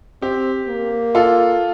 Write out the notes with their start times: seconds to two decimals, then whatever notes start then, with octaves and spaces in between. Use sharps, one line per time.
0.22 C4 G4
0.68 A#3
1.15 F4 A4